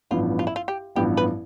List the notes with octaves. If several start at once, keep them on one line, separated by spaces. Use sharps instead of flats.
A1 G2 F3 B3 F4
F4
E4
F4
G4
A1 G2 F3 B3 G4
B4